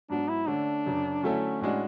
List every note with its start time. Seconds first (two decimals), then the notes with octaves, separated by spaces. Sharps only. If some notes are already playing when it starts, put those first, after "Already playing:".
0.10 G#2 F#3 B3 D4
0.28 E4
0.47 D3 A3 C#4 D4
0.86 F#2 C#3 F#3
1.23 D3 F#3 A3 C#4 E4 A4
1.61 A2 G#3 C#4 D4 F#4